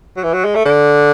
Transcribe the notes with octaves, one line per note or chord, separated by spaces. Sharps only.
F#3
E3
F#3
G#3
A3
D3